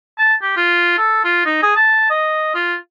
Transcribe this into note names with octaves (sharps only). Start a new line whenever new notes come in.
A5
G4
F4
A4
F4
D#4
G#4
A5
D#5
F4